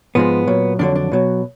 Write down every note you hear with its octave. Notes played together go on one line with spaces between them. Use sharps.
G#2 F3 G#3 B3
A#2 F#3
F2 D3 F#3 D4
D4
B2 F#3